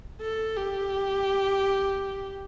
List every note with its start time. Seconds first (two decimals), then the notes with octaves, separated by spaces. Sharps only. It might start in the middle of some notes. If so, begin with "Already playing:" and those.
0.21 A4
0.57 G4